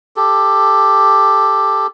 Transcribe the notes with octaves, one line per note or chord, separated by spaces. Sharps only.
G4 A4